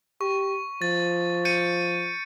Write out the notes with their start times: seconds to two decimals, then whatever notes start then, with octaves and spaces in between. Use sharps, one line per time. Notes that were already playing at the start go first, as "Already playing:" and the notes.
0.21 G4 C#6
0.82 F3 A6
1.45 G6 C#7 D#7